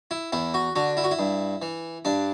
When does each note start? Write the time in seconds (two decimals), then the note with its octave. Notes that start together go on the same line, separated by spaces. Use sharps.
0.11 E4
0.32 E2 E4
0.54 F#4
0.76 D3 F#4
0.97 E4
1.04 F#4
1.11 E4
1.19 G2
1.62 E3
2.05 G2 D4